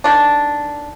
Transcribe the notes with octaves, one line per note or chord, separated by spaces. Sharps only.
D#3 D4